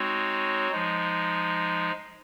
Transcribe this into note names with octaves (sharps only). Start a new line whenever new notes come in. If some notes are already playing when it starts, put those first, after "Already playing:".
Already playing: G#3 C4 D#4 F#4 C#5
F3 G#3 D#4